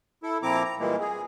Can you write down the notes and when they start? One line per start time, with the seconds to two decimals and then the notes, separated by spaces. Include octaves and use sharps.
0.23 E4 A4
0.43 A#2 F3 C4 E4 A#5 D6
0.65 A#5
0.80 A#2 E3 G3 G#3 A#3
1.00 G#4